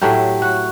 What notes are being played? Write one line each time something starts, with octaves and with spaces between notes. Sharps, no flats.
A2 F#3 A3 G4
F#4